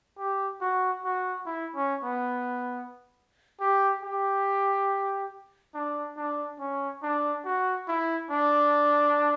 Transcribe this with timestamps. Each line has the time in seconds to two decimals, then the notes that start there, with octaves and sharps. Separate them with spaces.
0.18 G4
0.61 F#4
1.05 F#4
1.46 E4
1.76 C#4
2.04 B3
3.60 G4
4.03 G4
5.74 D4
6.17 D4
6.59 C#4
7.03 D4
7.45 F#4
7.88 E4
8.31 D4